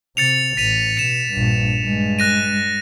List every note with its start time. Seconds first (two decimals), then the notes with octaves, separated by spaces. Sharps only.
0.17 C3 A6 C#7 F7
0.57 A1 B6 D#7 F7
0.97 B2 C#7 E7
1.32 A#1 G2
1.81 G2 G#3
2.19 F#6 A#6 D#7